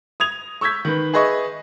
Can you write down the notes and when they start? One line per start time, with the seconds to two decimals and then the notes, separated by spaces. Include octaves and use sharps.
0.20 D#6 G#6 F7
0.61 C#6 E6 G6 G#6 B6
0.85 D#3 B4
1.13 G#4 B4 D#5 E5 C#6